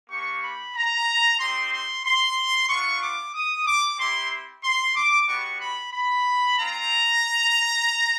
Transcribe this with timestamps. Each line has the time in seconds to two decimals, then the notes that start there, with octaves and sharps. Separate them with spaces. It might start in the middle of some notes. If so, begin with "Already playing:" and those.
0.10 A#3 D4 G4 C#6
0.43 B5
0.76 A#5
1.39 C4 D#4 G4 C6
1.72 C6
2.05 C6
2.69 B3 D4 F4 C#6
3.02 D6
3.35 D#6
3.67 D6
3.98 C4 E4 G4 C6
4.64 C6
4.96 D6
5.28 G3 B3 D4 F#4 C#6
5.61 B5
5.93 B5
6.58 C4 F4 A#5